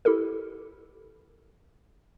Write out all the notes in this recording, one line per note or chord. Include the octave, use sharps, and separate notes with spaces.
E4 G4 A4 A#4